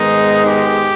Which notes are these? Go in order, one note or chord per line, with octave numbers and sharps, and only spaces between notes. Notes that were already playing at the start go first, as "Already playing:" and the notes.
Already playing: G#2 D#3 G#3 B3 D#4
G4